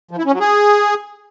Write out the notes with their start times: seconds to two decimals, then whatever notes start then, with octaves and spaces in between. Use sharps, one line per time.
0.11 F3
0.18 E4
0.26 C#4
0.33 F#3
0.40 G#4